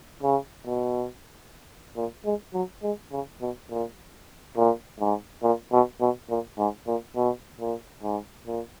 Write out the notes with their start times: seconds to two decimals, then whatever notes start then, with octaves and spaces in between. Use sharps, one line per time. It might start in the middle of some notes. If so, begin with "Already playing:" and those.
0.23 C#3
0.66 B2
1.96 A#2
2.25 G#3
2.54 F#3
2.83 G#3
3.12 C#3
3.41 B2
3.70 A#2
4.57 A#2
5.00 G#2
5.43 A#2
5.72 B2
6.01 B2
6.29 A#2
6.58 G#2
6.87 A#2
7.16 B2
7.60 A#2
8.03 G#2
8.47 A#2